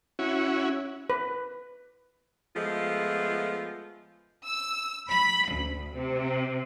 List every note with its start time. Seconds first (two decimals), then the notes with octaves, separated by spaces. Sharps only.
0.19 C#4 E4 F#4
1.10 B4
2.54 F3 G#3 A3 B3 F4
4.46 E6
5.10 B5
5.48 D2
5.93 C3